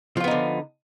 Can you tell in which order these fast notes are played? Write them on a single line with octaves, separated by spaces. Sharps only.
F3 F4 B3 D#4 D3